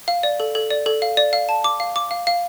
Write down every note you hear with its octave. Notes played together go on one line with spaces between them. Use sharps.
F5
D5
A4
A4
D5
A4
F5
D5
F5
A5
D6
F5
D6
F5
F5